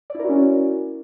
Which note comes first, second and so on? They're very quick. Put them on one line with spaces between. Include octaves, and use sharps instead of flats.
D5 E4 A#4 F#4 C#4